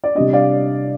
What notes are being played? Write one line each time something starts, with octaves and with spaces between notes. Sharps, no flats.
D5
C3 G3 D4 D#5
D5 F5